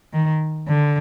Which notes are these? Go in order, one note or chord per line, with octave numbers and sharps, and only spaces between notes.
D#3
D3